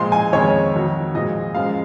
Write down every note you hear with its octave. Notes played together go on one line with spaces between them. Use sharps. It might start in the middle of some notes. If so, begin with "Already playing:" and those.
Already playing: A#2 F3 G#3 C6
G#5
F2 D#3 G#3 C#5
F2 D#3 F#3
A#2 F3 G#3 D#5
F#2 F3 G#3 F5